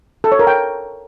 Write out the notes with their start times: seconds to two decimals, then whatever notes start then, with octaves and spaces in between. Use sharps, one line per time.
0.24 A4
0.32 C#5
0.39 A#4
0.47 G5